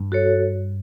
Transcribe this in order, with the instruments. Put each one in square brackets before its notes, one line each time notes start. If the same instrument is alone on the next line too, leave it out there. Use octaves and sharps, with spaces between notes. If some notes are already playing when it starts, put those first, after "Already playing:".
Already playing: [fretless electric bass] G2
[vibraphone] F#4 A4 C#5